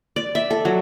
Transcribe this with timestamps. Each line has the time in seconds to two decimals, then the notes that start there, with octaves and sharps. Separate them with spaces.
0.16 D5
0.35 E5
0.51 A4
0.65 F#3